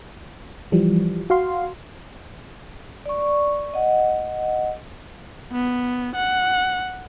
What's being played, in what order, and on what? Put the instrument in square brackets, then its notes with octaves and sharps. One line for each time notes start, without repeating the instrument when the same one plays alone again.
[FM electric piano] E3 F3 G3
F#4 F5 C6
[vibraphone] D5 C#6
D#5 F#5
[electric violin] B3
F#5